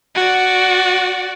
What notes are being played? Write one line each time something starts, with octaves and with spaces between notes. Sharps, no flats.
F#4 D5